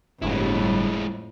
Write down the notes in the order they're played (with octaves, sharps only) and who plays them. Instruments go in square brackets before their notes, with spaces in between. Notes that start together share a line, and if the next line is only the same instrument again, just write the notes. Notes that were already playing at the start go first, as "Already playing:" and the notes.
[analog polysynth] G1 [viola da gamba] F2 A2 [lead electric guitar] G#3 E4